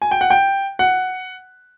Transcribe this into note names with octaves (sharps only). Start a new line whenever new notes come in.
G#5
G5
F#5
G5
F#5